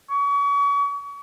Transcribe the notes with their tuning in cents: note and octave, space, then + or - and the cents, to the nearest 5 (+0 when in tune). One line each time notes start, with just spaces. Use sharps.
C#6 +35